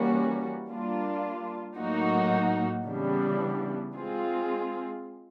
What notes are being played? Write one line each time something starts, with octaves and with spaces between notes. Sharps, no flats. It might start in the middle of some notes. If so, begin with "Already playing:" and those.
Already playing: E3 G3 A#3 C#4 F#4
G3 A#3 D4 F4
A2 F#3 A#3 D#4 F#4
C#3 E3 G3 B3 D4
G#3 C4 F4 G#4